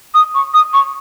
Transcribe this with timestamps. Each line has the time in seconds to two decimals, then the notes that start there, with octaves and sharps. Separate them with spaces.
0.14 D#6
0.34 C#6
0.54 D#6
0.73 C#6